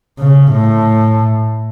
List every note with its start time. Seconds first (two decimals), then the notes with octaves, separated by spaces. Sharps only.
0.20 C#3
0.52 A2